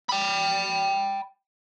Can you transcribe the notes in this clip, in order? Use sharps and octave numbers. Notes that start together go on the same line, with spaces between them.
G5 B5